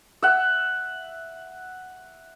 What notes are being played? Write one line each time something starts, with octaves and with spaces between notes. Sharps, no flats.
E5 F#5